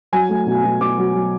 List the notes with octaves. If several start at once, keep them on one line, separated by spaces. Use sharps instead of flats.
F#3 G#5
A3
B2
B2
B2 D6
F#3
F#3